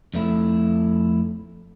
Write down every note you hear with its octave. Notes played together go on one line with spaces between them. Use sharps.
F2 A3 E4